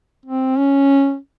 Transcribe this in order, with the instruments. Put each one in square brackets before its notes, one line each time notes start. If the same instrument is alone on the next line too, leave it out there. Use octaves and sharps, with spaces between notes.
[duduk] C4
C#4